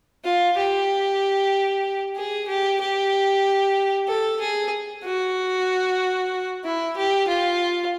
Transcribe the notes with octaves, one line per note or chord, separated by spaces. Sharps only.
F4
G4
G#4
G4
G4
A4
G#4
F#4
E4
G4
F4